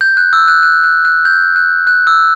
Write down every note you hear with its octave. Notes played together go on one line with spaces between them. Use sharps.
G6
F#6
E6
F#6
F#6
F#6
F#6
G6
F#6
F#6
E6